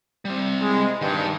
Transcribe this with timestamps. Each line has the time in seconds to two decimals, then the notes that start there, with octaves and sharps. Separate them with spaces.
0.25 G3 C4
0.62 G#3
1.01 G2 D#3 G5